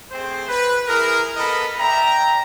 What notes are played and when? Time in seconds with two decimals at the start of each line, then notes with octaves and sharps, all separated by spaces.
0.11 A3 C4 G#4 C5
0.49 B4
0.87 E4 G#4 A#4
1.37 B3 A4 A#4 D#5 B5
1.79 D5 E5 G5 A#5